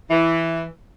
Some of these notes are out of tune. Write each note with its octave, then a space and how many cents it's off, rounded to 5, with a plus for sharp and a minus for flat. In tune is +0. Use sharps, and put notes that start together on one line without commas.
E3 +0